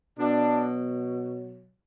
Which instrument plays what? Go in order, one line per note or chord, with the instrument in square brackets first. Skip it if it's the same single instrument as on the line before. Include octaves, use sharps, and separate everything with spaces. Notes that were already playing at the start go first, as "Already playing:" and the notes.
[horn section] B2 F#3 D4